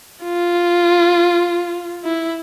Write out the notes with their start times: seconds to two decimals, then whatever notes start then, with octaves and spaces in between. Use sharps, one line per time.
0.24 F4
2.04 E4